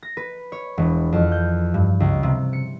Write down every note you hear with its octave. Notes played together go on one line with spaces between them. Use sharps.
A#6
B4
C#5
E1
F2
G6
G2
C#2
C3
C#7